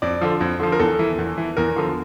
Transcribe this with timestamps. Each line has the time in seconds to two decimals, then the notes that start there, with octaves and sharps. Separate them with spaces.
0.02 F2 D5
0.21 D3 F3
0.41 F2
0.60 D3 F3
0.72 A#4
0.79 E2 A4
0.99 E3
1.18 E2
1.38 E3
1.57 E2 A#4
1.76 D3 F3